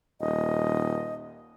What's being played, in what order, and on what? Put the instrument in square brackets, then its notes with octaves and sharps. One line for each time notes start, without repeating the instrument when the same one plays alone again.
[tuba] D#1 [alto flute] D#5